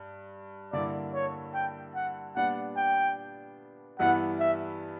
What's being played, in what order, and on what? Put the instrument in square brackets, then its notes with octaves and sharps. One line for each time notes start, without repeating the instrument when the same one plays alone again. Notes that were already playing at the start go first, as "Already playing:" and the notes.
Already playing: [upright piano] G2
[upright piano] G2 D3 A#3 E4 [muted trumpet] D5
[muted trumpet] C#5
G5
F#5
[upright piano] A#2 G3 B3 D4 [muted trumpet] F#5
[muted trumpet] G5
[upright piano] G2 E3 G3 B3 E4 [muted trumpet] F#5
[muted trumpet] E5